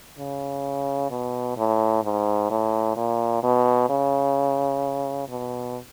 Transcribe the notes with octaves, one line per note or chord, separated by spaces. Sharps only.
C#3
B2
A2
G#2
A2
A#2
B2
C#3
B2